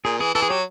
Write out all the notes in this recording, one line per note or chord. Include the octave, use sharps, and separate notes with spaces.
A#2 G#4
E3 G#4
E3 A4
G#4
F#3 G4